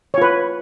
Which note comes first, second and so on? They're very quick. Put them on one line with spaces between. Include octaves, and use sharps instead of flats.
C#5 F4 B4